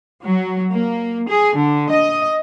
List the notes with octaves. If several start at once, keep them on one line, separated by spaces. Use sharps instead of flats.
F#3
A#3
G#4
D3
D#5